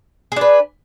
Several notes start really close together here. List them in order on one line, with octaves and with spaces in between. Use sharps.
G#4 D4 B4